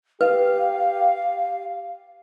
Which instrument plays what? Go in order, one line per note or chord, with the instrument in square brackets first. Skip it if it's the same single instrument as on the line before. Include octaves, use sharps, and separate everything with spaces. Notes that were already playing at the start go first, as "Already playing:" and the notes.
[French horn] G4 [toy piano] B4 [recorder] F5